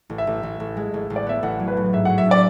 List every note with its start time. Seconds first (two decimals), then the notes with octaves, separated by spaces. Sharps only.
0.10 A1
0.18 E5
0.27 A1
0.43 A1
0.60 A1
0.77 G#3
0.94 A1
1.10 A1
1.16 D5
1.27 B3 E5
1.43 A1 F#5
1.60 F#3
1.68 B4
1.77 A2
1.93 G#2 E5
2.05 F#5
2.10 F#3
2.18 E5
2.26 D4
2.31 D5